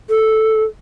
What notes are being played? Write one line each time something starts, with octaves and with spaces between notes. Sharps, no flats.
A4